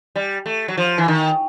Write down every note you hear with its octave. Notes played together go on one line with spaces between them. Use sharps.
G3
A3
F#3
F3
E3
D#3